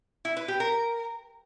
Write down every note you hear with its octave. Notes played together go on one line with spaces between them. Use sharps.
E4
B4
G4
A#4